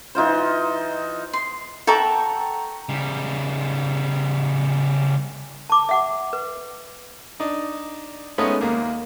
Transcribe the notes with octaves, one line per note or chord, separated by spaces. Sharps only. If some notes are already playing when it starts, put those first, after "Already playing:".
E3 D#4 F4 C5
C6
A4 E5 F#5 G5 A#5 C#6
C#3 G3
A5 D6
E5 F#5 D6
B4
D4 D#4
G#3 A3 B3 C#4 D#4
D#2 A#3